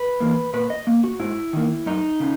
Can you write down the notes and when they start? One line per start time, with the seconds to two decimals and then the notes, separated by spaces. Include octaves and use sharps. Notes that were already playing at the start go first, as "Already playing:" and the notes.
Already playing: B4
0.20 E3 A#3
0.53 A#2 B4
0.70 D#5
0.87 A#3
1.04 F#4
1.19 G#2 E4
1.53 D#3 A#3
1.86 F#2 D#4
2.20 C#3